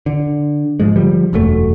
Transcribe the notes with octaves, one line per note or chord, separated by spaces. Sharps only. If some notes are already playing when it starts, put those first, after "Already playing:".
D3
G#2 F3 G#3
D3 F3 G3
E1 F#2 F#3 A3